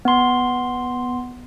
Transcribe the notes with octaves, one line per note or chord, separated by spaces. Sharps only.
B3 C6